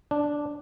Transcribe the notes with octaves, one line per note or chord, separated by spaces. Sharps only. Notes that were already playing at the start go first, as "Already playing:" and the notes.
D4